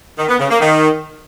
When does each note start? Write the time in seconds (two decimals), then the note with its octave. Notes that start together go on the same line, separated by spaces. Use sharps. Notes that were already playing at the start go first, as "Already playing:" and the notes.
0.18 D#3
0.28 B3
0.39 C#3
0.50 A#3
0.61 D#3